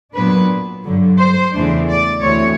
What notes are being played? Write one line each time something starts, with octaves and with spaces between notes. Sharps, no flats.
A#2 F#3 B3 D4 B4
G2 D3 F#3
C5
E2 C#3 E3 A3 D4
D5
D2 C3 E3 C#5